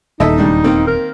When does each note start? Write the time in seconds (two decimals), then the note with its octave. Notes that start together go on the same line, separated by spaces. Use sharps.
0.20 D#1 E2 D#4 A4 D#5 E5
0.38 C#3 G3 D4
0.64 D#3 A#3 C4
0.87 A#4